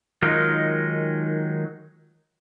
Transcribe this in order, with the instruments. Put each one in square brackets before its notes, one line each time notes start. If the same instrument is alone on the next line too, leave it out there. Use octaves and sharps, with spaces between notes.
[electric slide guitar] D#3 F#3 G#3 D#4 F4 A#4